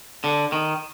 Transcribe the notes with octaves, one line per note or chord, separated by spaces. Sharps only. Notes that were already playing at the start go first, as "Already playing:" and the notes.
D3
D#3